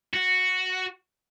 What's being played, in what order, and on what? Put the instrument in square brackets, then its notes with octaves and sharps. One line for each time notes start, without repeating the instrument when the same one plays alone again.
[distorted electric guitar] F#4